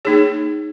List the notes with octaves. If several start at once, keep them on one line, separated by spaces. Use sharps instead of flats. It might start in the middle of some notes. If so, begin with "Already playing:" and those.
A#3 D#4 G#4 C#5